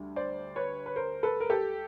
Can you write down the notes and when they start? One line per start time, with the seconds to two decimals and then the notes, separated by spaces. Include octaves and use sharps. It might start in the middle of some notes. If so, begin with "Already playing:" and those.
Already playing: D2 G3
0.16 C5 D5
0.56 B4 C#5
0.86 B4
0.96 A#4 C5
1.23 A4 B4
1.40 A#4
1.50 G4 A4